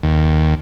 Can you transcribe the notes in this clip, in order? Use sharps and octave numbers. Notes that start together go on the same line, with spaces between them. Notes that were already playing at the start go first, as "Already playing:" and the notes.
D#2